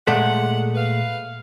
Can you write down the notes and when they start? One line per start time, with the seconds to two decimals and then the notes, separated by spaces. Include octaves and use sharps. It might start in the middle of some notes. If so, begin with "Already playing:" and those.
0.07 A#2 G#3 A3 F#5
0.75 B4 F5